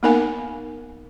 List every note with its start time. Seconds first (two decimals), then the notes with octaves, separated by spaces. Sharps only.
0.03 A#3 B3 D#4 A#4 F5 G#5